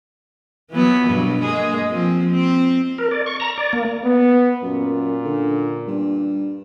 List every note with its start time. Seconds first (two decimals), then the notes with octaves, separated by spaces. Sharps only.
0.71 E3 F#3 B3
1.07 G2 B2 F#3
1.42 G#3 A#3 G#4
1.90 F3 C4
2.31 C4
2.98 A#4
3.11 D5
3.26 C#6
3.40 A#5
3.58 D5
3.73 A#3
4.04 B3
4.62 F#2 A#2
5.25 D3
5.87 G2